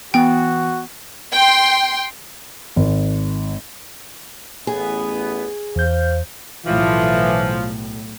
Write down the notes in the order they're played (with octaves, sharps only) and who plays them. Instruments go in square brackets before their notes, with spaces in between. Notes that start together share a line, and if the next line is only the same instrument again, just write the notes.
[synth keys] E3 B3 [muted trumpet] F#4 [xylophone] G5
[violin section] G5 C6
[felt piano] G#1
[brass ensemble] A1 B3 [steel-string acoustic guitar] G#4
[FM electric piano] E2 G6 [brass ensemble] C5 F5
[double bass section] B1 A2 [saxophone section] E3 [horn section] F3